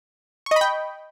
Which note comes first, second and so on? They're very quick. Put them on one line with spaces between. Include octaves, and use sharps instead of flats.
C#6 D#5 B5 G5